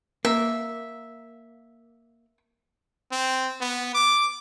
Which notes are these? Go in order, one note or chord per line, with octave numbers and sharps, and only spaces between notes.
A#3 E5
C4
B3
D6